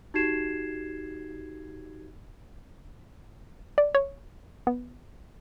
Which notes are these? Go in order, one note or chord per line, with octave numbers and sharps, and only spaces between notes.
D#4 F#4 G4 G#6 C7 E7
D5
C#5
B3